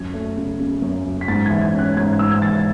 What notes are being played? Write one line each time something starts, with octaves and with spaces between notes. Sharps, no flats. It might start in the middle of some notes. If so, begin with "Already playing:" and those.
Already playing: F#2 G#6
A3
C#3
C#3
F#2
F#2
B6
G#2 A6
G#6
E3
G#6
C#4
F#6
G#2 G#6
G#2 E6
G#6
E3 A6